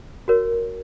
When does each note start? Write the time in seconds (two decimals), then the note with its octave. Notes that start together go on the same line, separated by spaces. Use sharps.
0.28 F#4 A#4 C#5